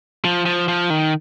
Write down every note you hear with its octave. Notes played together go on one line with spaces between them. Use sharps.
F3
F3
F3
D#3